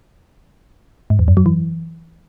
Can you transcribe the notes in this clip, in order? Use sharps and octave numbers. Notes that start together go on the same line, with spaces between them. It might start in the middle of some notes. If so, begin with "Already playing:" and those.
G#2
E2
F#2
F#3
E3